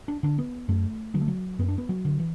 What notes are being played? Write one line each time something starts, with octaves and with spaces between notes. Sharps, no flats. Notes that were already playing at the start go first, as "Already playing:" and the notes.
D4
D3 D4
B3
F#2 A3
D3 F#3
A3
F#3
F#2 B3
D4
B3
F#3
D3
E3